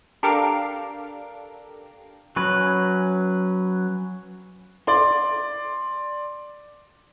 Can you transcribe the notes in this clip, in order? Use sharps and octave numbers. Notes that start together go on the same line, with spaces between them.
D4 G4 A4 A#4 F5 D6
F#3 C#4 B4
D5 C6